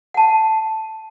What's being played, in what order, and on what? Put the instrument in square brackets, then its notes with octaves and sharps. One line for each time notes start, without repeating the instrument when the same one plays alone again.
[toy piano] F#5 A5